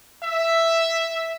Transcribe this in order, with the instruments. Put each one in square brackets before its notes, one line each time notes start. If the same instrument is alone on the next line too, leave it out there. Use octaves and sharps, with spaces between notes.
[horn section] E5